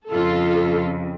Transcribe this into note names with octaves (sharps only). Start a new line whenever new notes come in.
F2 C#3 F4 A4